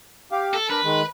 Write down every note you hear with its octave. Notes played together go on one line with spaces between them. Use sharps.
G4 F5
A4
D4 A#4 B4
D#3 G#3